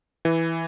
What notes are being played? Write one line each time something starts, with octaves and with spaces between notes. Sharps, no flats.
E3